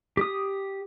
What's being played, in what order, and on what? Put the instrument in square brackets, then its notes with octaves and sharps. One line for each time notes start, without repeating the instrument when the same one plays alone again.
[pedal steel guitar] G4 D#6